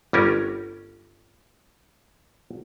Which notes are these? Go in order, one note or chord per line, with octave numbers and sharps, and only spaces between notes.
G1 G3 C#4 A#4